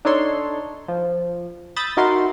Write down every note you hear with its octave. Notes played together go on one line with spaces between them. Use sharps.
D4 D#4 A4 C#5 C6
F3
B5 D#6 E6 G6 A6
D#4 E4 F#4 A#4 D#5 C6